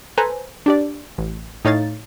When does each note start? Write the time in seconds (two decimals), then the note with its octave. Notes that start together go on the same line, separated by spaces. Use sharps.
0.18 A4 B4 C5 G#5 A#5
0.66 D4 G4 D5
1.18 A1
1.65 A2 D#4 C#5 F5 A6